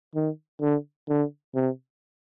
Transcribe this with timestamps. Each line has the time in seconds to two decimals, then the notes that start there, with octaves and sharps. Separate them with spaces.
0.15 D#3
0.62 D3
1.09 D3
1.55 C3